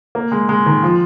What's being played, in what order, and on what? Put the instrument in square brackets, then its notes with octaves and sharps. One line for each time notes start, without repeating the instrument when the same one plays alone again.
[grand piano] A#3
G#3
G#3
D#3
F3